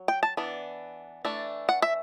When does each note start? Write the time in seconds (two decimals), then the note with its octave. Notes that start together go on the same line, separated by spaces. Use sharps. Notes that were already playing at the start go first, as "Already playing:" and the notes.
Already playing: F#3
0.08 G5
0.23 A5
0.37 E3 B3 D4
1.25 E3 A3 D4
1.69 F#5
1.82 E5